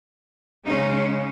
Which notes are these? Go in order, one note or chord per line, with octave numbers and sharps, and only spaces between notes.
C#3 G#3 C#4 D#4